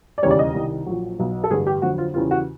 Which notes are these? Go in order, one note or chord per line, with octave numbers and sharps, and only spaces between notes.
D5
E1 D#2 C#3 E3 G3 C#5
D5
D#5
C2 C3 D#3 G3
A#1 A#2 F#3
B1 B2 F#3
A4
A1 G2 D3 G#4
G4
F2 D3 F#3 F#4
F4
E2 C#3 E3 G3 F4
F#4